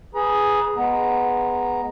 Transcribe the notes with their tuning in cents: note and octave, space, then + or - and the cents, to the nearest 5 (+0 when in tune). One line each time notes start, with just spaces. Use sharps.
G#4 +0 B4 +5 A#5 +40
G#3 +0 B3 +0 A#5 +0